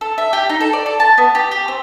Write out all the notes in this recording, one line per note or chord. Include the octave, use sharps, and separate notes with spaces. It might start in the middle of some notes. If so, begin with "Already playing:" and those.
A4
E5
G4
D#4
A4
D5
A4
A5
B3
G4
G4
C4